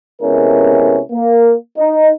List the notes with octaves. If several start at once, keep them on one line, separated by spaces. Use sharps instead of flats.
C3 G#3 B3 C#4 E4 A#4
A#3
D#4